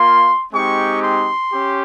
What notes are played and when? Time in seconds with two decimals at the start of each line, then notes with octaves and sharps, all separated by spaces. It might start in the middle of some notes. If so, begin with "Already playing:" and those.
Already playing: A#3 F4 C6
0.53 G#3 C4 D#4 G4 C#6
1.03 C6
1.53 C#4 G4